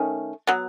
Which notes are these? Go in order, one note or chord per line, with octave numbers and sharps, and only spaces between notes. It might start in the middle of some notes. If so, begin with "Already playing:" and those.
Already playing: D#3 A3 C#4
F#3 B3